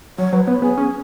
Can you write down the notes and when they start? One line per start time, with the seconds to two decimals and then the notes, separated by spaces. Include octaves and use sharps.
0.18 F#3 C#5
0.33 F#3 B4
0.42 C#5
0.47 B3 B4
0.62 B3 G#4
0.77 C#4